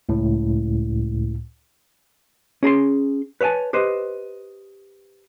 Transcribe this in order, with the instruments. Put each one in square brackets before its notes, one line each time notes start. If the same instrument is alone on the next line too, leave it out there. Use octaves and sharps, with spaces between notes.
[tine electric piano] C#2 A2
[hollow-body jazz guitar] C#4 G#4 A#5 C6
B4 C#5 E5 G#5 A5
G4 B4 C5 D#5